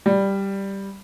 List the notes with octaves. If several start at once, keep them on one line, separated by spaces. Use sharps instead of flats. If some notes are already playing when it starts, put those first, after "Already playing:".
G3